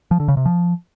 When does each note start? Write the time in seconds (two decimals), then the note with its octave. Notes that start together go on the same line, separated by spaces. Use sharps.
0.11 F3
0.20 D3
0.28 C#3
0.37 C3
0.46 F3